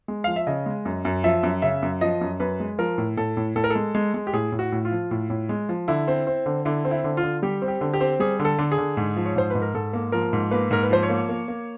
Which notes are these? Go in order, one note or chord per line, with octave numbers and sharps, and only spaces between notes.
G#3
F3 F5
E5
C#3 D#5
G#3
F#2
F#2
F3 E5
F#2
C#3 E5
F#2
F3 D#5
F#2
F#2 B4
G#3
F3 A#4
A2
A2 A4
A2
A2 A4
A#4
A4
G#3
G#3
G#3
G4
A2 G#4
A2
F#4
A2
F4
F3
A2
A2
G#3
F3
D3 E4
C4
C4
D3
D3 E4
C4
E4
D3
F4
D3
G3 G4
C4
G4
D3
G4
C4
G3 G#4
D3
A4
D3
G#4
D3
G#2
F3
C#5
G#2 C5
G#2 B4
A#4
G#2 A4
A#3
F3 A#4
G#2
A#3 B4
G#2 A#4
B4
F3 C5
C#5
A#3
A#3
A#3